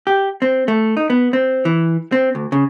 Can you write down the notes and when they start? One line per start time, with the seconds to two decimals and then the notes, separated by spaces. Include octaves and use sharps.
0.07 G4
0.42 C4
0.68 A3
0.97 D#4
1.10 B3
1.33 C4
1.65 E3
2.12 C4
2.35 D2
2.52 C#3